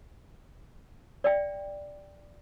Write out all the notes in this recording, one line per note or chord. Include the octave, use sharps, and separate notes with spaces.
D5 E5 G5